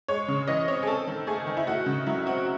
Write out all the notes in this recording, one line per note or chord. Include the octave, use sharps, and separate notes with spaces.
G#3 C#5
C#3
E3 D#5
C4 C#5
G#4
C4 A4
D#3
A3 G#4
D#3
E4
A3 F#4
C#3
F#3 E4
C4 F#4